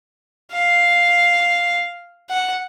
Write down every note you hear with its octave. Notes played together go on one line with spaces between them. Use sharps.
F5
F#5